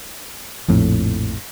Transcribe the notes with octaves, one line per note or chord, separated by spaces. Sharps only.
A#1 F2 A2